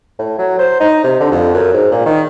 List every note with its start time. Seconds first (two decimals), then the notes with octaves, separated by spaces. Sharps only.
0.18 A2
0.38 F#3
0.59 C5
0.80 D#4
1.04 C3
1.20 D3
1.32 F2
1.54 F#2
1.73 G#2
1.91 A#2
2.05 D#3